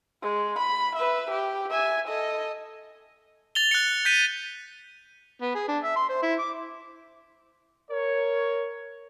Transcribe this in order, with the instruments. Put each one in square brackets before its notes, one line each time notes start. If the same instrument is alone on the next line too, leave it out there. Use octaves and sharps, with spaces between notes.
[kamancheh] G#3
B5
B4 E5
G4
E5 G#5
A4 D#5
[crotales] A6 F7 G7
F#6 C#7
G6 B6 D#7
[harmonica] B3
G#4
D4
E5
C6
C5
E4
D6
[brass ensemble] A#4 C#5